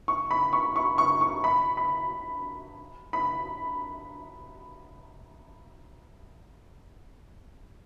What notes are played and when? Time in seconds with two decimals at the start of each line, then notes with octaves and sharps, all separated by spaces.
0.08 C#6
0.31 B5
0.53 C#6
0.76 C#6
0.98 C#6
1.21 C#6
1.44 B5
1.77 B5
3.13 B5